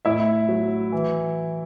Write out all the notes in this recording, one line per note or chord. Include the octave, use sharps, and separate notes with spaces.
A2 E4 E5
F#3
E3